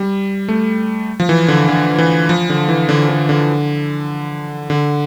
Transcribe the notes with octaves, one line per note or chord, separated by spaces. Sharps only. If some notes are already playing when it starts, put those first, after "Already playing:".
Already playing: G3
A3
F3
E3
D3
D3
E3
F3
D3
E3
D3
D3
D3
D3